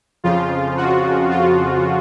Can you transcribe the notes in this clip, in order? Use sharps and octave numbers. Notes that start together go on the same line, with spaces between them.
F2 C#3 F3 F4
F#4
F4